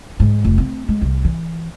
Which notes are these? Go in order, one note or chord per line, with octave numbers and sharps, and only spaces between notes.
G#2
F1
C4
G#3
C2
E3